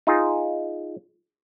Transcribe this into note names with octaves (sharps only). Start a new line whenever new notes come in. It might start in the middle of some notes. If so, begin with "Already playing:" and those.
D#4 F4 G#4